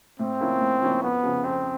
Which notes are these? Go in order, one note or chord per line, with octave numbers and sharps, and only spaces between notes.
A2 C4
F3 A#3 C#4 E4
A2
F3 A#3 C#4 E4
F2 B3
C#3 F3
F2 C4